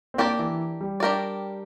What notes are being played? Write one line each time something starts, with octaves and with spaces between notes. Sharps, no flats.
C4
A#3 D4 G4 A#4 D5
E3
G3
D4 G4 A#4 D5